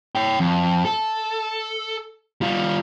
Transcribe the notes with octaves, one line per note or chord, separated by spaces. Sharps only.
C#5 G5
F2
A4
G3 F4